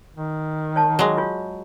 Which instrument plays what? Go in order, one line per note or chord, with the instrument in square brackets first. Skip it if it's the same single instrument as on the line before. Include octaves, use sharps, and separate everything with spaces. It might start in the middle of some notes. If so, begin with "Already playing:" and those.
[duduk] D#3
[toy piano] C#5 A5
[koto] F#3 G#3
[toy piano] F4 C#5